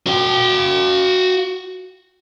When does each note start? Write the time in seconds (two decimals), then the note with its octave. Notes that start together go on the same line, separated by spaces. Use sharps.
0.07 F#4 G5